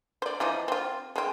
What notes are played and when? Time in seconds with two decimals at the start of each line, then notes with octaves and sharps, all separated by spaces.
0.22 C5 D5
0.40 E3 F3 D#4
0.68 C4 F4
1.16 G#3 C4